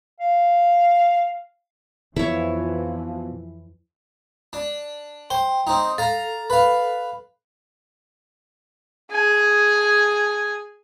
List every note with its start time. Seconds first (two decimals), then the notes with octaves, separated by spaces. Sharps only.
0.20 F5
2.16 F2 B2 E3 F3 E4 C#5
4.53 D4
5.30 C5 G5
5.67 C4 D#4
5.98 A4 F5 A#5
6.50 B4 F5
9.12 G#4 G#5